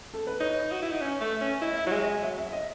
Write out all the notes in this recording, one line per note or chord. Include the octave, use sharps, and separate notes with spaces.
A4
B4
D#4 C#5
F#4
E4
D#4
C#4
A3
C#4
E4 D#5
E5
F#3
G#3 D#5
D#5
F#3 E5
E5
D#5